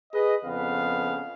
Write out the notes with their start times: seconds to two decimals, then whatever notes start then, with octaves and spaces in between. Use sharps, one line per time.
0.13 G#4 B4 D#5
0.44 F2 C#3 B3 F5